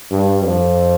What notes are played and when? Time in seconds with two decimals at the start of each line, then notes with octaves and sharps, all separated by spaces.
0.11 G2
0.44 F2